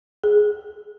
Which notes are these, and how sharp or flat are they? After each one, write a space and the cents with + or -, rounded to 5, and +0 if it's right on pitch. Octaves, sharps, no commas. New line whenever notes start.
G#4 +5